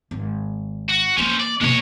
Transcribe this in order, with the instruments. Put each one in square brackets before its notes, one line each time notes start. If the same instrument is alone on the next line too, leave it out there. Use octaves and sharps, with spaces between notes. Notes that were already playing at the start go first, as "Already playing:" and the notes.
[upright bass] G#1
[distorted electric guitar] F#4
[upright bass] E3 A#3 [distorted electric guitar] C#4 C5
[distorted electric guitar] D5
[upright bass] B2 A#3 [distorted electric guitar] G#3 C#5